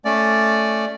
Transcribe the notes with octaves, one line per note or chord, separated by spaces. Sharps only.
A3 C#4 D5